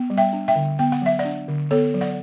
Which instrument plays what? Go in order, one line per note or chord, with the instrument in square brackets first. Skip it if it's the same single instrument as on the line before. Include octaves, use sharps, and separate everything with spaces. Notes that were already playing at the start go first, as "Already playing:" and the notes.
Already playing: [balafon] B3
G3
E5 G5
D4
E5 G5
D3
B3 G5
F#5
F#3 E5
D5 F#5
D4
D3
B3 A4 C#5
F#3
D5 F#5